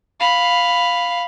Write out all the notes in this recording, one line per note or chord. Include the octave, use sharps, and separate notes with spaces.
F5 B5